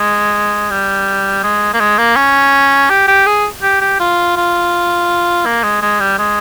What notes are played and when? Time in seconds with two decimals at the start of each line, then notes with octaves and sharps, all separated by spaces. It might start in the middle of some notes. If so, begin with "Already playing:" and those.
Already playing: G#3
0.71 G3
1.43 G#3
1.74 A#3
1.80 G#3
1.98 A#3
2.16 C#4
2.90 G4
3.08 G4
3.26 G#4
3.62 G4
3.81 G4
4.00 F4
4.36 F4
5.46 A#3
5.63 G#3
5.82 G#3
6.00 G3
6.18 G#3